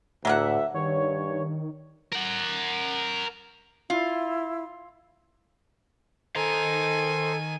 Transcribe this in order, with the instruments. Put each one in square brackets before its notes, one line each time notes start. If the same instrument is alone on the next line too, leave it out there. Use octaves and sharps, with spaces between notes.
[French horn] D2 [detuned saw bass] A2 [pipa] F#3 A#3 F#5 [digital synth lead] E5
[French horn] G2 [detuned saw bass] D#3 [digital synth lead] C#5
[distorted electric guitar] A#4 F#5
[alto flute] E4 [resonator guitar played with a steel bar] F4
[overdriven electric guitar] D#3 A#5 [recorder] A4 [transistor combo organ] C5 [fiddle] G#5